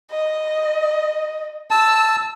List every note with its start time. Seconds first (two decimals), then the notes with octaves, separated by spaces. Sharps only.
0.11 D#5
1.71 A5 E6